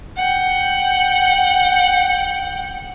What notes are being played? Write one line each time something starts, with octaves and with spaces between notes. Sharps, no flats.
F#5 G5